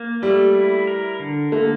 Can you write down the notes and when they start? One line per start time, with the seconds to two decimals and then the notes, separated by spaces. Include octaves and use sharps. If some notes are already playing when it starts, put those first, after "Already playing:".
Already playing: A#3
0.22 G3 A3
0.55 E4
0.87 A#4
1.20 D3
1.52 A3 A#3